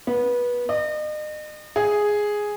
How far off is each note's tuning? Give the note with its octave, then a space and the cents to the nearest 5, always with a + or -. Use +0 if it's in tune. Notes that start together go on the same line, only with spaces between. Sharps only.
B3 -20
D#5 -40
G#4 +0